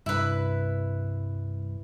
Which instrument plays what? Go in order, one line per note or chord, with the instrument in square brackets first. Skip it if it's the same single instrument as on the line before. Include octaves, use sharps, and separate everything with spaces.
[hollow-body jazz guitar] C2 G2 [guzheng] E4 B4